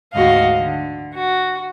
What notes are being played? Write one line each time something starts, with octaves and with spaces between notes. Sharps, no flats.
D2 G#2 D3 F#4 D#5 F5
D3
F#4